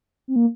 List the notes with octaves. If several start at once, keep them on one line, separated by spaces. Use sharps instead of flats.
C4
A#3